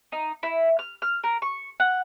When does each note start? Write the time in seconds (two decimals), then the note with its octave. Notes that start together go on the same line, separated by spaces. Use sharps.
0.12 D#4
0.43 E4
0.79 F6
1.02 F6
1.24 A#4
1.42 C#6
1.80 F#5